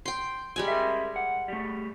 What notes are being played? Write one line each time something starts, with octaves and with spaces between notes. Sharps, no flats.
G5 C6
G3 G#3 G#5
A#4 E5
F#5
G3 A3